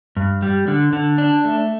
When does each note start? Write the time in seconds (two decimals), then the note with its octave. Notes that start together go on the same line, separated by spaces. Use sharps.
0.17 G2
0.42 G3
0.68 D3
0.93 D3
1.18 D4
1.45 A3